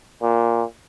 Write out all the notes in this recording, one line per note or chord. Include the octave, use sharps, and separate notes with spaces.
A#2